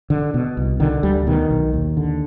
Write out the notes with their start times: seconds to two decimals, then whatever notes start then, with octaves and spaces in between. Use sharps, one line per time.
0.10 D3
0.34 B2
0.57 C2
0.80 D3 D#3
1.03 D2 G3
1.27 B2 D#3
1.50 B1
1.73 D#2
1.97 D3